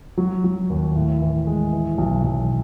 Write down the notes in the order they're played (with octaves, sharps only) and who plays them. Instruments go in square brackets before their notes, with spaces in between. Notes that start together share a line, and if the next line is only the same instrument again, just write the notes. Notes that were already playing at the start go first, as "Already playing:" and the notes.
[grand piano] F#3
F#3
D#2
A2
E3
G#3
E3
B1
B1